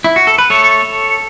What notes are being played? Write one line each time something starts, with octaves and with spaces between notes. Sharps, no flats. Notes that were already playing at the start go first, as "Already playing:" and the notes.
E4
F#4
A4
B4
A3 A4 C#5